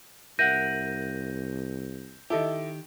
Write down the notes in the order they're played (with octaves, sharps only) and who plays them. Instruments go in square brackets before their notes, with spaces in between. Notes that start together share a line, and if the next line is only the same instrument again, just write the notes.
[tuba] C2 [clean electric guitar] A#4 E5 F#5 [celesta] G6 A#6 D#7
[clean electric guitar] D#3 G4 [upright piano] E4 A4 D#5